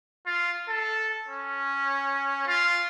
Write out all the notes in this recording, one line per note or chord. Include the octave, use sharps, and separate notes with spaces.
F4
A4
C#4
F4